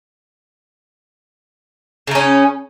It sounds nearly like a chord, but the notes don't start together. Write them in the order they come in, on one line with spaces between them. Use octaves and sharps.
C#3 D#4 C#4